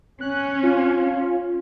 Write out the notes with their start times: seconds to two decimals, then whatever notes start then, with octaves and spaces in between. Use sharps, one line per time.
0.21 C#4 F#6
0.63 F4